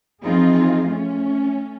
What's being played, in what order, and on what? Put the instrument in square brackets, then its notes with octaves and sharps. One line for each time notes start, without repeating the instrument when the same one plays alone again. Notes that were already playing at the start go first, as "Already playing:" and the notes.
[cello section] E3 F3 C4 D#4 F4 G#4
A3 C#4